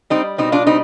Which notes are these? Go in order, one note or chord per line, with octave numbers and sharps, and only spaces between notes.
G3 C4 D#4
B2 C4 D#4
D4 F4
G3 C4 D#4